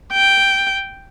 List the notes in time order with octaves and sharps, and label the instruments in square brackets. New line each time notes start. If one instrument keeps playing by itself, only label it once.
[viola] G5